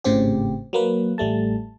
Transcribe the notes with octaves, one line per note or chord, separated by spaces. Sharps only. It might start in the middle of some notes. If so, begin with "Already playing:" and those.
G#1 A2 C#3 C4 G4
F#3 A#3 B4
A1 G3 A3 A5